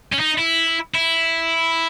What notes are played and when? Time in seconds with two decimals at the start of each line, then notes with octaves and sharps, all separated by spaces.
0.13 C#4
0.20 D#4
0.39 E4
0.94 E4